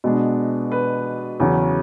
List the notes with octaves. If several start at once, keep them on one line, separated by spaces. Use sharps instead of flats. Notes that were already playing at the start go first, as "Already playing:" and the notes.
B2 G#3 B3 D4
B4
E2 C#3 F#3 C#4